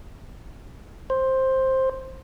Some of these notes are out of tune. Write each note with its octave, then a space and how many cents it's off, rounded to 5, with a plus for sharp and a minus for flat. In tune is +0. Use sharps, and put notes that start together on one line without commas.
C5 +10